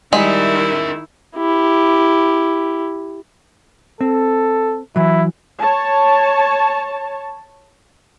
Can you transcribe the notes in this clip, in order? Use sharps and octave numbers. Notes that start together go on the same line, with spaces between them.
D#3 G3 G#3 E4 A#4 E5
E4 G4
C4 A4
E3 F#3 E4
C#5 A5